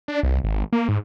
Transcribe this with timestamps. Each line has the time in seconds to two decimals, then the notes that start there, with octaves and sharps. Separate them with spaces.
0.08 D4
0.23 C2
0.44 G#1
0.73 A#3
0.88 G#2